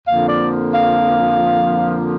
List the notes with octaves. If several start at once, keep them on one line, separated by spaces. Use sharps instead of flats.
F2 D3 F3 A#3 F5
D5
F5